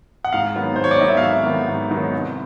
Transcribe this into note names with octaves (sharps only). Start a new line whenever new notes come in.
F#5
G#2 F5
D#3 F#3 B3 D#4
G#2 C5
C#5
D5
D#3 F#3 B3 D#4 D#5
E5
F5
G#2 E5
D#3 F#3 B3 D#4
G#2
D#3 F#3 B3 D#4
C2